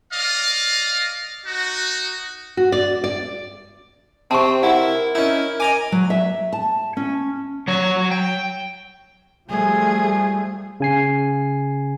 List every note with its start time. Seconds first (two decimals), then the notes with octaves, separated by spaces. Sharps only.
0.11 D5 D#5 F5
1.44 D#4 F#4
2.57 F#4
2.72 D5
3.04 D5
4.31 C3 C4 A5 C#6
4.63 E4 A#4 F#5
5.15 C#4 D#4 E4
5.60 D#5 G#5 A#5 D6
5.92 F#3
6.10 E5
6.53 A5
6.97 C#4
7.68 F#3 C#5
8.11 G5
9.49 F3 G3 A3 G#4
10.80 C#3 G#5 C7